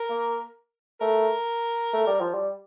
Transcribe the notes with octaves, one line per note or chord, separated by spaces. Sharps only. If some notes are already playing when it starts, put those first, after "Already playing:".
Already playing: A#4
A#3
A3 A#4
A3
G3
F3
G3